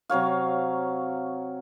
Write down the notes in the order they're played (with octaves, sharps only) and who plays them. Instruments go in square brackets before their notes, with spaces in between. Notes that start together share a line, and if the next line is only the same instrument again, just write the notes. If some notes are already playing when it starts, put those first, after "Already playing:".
[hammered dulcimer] C3 F#3 C#5 F5